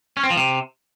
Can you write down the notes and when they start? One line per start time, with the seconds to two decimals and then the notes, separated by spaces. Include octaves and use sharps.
0.17 C#4
0.23 C4
0.30 F3
0.37 C3